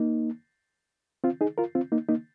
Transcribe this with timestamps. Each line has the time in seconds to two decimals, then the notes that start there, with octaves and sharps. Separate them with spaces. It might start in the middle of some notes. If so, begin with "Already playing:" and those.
Already playing: A#3 D#4
1.24 C4 F4
1.41 D#4 G#4
1.58 F4 A#4
1.75 C4 F4
1.92 A#3 D#4
2.09 A#3 D#4